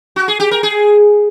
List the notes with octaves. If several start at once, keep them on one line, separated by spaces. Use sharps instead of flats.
F#4
G#4
G4
A#4
G#4